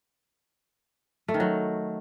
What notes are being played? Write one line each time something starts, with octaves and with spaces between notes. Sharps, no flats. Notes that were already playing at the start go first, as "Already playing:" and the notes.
A3
D#3
F#3